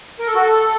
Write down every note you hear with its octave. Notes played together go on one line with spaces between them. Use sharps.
A#4
A4
F#4
A4